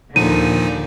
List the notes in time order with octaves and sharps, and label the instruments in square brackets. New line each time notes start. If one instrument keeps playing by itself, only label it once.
[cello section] D#2 D3 [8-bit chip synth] A#2 F3 D#4 [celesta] D#7